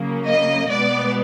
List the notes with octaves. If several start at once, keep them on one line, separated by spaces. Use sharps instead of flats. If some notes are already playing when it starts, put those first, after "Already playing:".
Already playing: C#3 F#3 A#3
D#5
B2 G#3 B3 D5